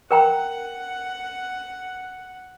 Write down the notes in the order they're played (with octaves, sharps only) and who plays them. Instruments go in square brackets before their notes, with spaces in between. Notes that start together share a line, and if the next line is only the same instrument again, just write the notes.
[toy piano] A#4 G5 A#5 [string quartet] F#5